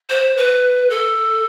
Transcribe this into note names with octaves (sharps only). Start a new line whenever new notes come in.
C5
B4
A4